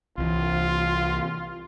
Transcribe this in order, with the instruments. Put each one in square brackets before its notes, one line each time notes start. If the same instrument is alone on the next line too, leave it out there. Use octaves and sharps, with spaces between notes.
[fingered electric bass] C2 E3 [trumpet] F4